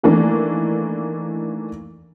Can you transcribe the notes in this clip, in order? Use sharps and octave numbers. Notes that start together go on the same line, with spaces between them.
D#3 E3 A3 A#3 D4